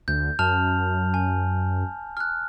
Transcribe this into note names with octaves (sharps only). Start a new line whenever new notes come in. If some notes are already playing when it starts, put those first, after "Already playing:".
D2 G6
F#2 A5 F6 F7
G#5
F6 F#6